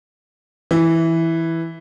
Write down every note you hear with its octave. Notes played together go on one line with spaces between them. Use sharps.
E3